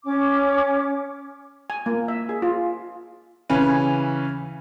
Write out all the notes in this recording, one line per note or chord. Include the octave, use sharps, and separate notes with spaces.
C#4 D6
G#5
A#3
E5
G#4
F4
C#3 E3 C#4 B4